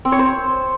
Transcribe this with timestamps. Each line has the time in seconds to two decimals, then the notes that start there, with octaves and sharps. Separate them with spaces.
0.05 C4
0.12 C#5
0.19 C5